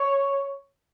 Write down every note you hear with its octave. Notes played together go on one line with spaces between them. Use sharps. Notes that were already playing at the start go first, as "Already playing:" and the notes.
Already playing: C#5